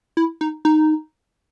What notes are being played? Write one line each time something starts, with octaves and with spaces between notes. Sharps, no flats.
E4
D#4
D#4